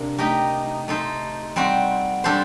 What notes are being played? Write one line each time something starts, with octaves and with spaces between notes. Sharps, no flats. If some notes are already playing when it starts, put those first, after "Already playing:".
Already playing: C3 A#3 D4
A3 D#4 G4 A#4
A3 D#4 A4 C5
G3 C4 F#4
G3 D4 A4 C5